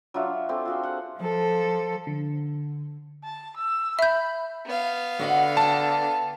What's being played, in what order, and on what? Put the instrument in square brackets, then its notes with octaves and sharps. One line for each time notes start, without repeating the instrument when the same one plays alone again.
[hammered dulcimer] F#3 D4 F4 E5
C4 G4 A4 C5
F4 F#4 G#4
F#5
[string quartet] F3 A4
[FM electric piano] D3
[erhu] A5
E6
[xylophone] E5 G6 [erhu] B5
[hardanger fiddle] B3 F5
[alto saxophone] D3 [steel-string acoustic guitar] F#4 D#5 F#5
[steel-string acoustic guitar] F#4 G5 [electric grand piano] A5